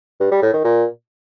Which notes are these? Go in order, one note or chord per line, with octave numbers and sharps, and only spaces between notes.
G2
G3
A2
D#3
A#2